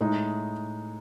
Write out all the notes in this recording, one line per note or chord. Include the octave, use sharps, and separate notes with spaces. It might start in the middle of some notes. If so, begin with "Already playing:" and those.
A2 G#3 D#4